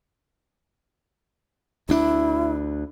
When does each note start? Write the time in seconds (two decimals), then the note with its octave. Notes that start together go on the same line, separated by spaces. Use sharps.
1.89 D2 D4 E4